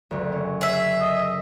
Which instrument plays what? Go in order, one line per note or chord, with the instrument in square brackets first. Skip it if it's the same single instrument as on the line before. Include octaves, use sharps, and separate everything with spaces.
[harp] F#1 D2
C#4
[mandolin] G#4 E5 [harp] C#5
[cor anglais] D#5